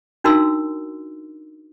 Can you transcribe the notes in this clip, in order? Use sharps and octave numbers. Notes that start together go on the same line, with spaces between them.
D4 D#4 F#4 A#4 C6 E6